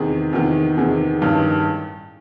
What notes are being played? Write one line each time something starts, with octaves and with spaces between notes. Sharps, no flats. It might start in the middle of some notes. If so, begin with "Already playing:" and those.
Already playing: E2 C3 D#3 G#4
E2 C3 D#3
E2 C3 D#3 G#4
A1 G2 D#3